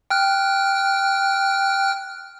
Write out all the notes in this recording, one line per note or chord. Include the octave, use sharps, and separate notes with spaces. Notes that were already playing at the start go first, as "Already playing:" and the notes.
G5 F6 F#6